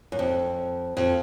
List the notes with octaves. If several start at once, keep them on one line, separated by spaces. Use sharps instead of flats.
F#2
F2
F2